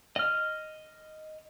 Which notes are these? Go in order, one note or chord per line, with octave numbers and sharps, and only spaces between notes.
D#5 F6